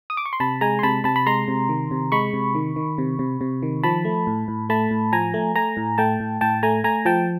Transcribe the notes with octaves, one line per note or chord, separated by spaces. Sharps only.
D#6
D6
C#6
C6
C3 A5 B5
G#3 G#5 A#5
C6
C3 A5 B5
C3 A5 B5
B5
G#3 A#5 C6
C3
D#3
C3
G#3 B5 C#6
C3
D#3
D#3
C3
C3
C3
D#3
F3 A5 B5
A3
A2
A2
A3 A5 B5
A2
F3 G#5 A#5
A3
A3 G#5 A#5
A2
A3 G5 A5
A2
A2 G5 A5
A3 G#5 A#5
A3 G#5 A#5
F3 G5 A5